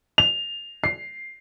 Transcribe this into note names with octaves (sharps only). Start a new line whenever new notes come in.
F7
C7